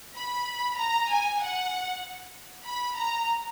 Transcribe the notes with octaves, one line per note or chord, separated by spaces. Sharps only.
B5
A#5
G#5
F#5
B5
A#5